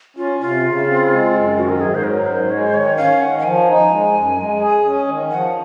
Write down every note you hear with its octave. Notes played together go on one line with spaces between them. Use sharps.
C#4 F4
C3 F4
C#3
C4
G#3
F#2
D#3 F#4
A#4
G#2 G#4
C5
F#3 A#4
G#2 C5
G#3 C#5
C5
D#3 C#5
C#4 F5
D#3 F#5
F#5
F3 G#5
D#4
G#3
F#2
G#3
G#4
C#4
D#3
F3 F#5